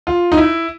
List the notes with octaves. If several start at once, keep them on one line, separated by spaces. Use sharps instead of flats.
F4
D#4
E4